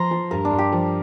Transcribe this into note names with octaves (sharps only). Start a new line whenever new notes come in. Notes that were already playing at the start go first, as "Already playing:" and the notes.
Already playing: F3 A#5 C6
F3
G2 A#4
D4
G2
G4
F3